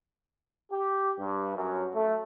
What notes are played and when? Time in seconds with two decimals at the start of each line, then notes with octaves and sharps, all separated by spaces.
0.71 G4
1.18 G2
1.55 F#2
1.94 A3